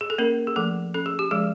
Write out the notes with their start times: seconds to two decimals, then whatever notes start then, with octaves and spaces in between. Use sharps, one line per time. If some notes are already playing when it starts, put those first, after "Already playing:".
0.01 G#4
0.10 A4
0.18 A#3 C#4 A#4
0.47 G#4
0.56 F3 A3 A4
0.94 C#4 A4
1.06 G#4
1.19 G4
1.31 F3 G#3 G#4